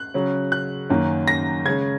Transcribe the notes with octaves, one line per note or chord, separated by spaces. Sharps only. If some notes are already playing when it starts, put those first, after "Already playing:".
Already playing: F#6
C#3 F#3 C#4
F#6
F#2 D#3 A#3 C#4
A#6
C#3 G#3 C#4 G#6